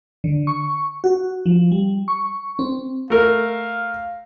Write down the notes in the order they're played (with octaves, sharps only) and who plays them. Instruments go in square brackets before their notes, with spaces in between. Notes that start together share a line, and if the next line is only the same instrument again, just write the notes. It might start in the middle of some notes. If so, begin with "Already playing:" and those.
[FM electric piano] D3
C#6
F#4
F3
G3
C#6
C4
[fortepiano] A3 A#4 [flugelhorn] F5